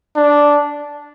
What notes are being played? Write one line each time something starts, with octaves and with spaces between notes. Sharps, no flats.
D4